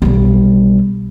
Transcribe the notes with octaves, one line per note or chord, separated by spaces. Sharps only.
B1 G3